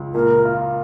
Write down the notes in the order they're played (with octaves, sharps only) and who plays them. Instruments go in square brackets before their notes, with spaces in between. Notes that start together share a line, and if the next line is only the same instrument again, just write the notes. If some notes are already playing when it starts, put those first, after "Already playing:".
Already playing: [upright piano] C#2
[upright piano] A#2 [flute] A#4
[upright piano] F4